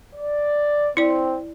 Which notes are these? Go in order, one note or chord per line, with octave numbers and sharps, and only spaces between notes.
D5
C4 E4 D5